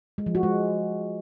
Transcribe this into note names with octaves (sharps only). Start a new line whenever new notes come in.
G#3
F3
F#4
G#3